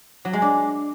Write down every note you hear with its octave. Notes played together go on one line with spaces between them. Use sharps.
F#3
G#3
D4